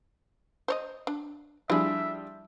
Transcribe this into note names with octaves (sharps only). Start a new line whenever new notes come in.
C5 C#5 D#5
D4
F3 G3 D4 E4 G#4 E5